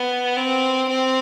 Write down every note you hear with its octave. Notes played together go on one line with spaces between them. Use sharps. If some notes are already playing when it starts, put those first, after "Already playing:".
Already playing: B3
C4
C4